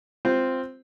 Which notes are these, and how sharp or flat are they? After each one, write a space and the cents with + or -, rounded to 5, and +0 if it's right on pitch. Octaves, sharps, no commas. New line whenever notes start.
C4 +0 F4 +0 C5 +0